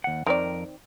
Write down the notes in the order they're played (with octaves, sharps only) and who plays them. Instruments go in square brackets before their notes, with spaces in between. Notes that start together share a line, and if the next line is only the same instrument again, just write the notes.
[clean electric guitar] D#2 F#5
[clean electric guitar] F2 A#4 [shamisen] D#3 C4 D5